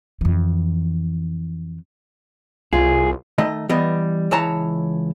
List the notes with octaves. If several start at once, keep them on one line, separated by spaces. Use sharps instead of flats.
F2 E3
C2 F4 G#4
D#3 A3 D#5
E3 G3 B3 D#5
C#2 E3 C#5 A5 A#5